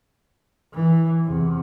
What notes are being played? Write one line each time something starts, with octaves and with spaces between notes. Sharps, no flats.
E3
E2 C3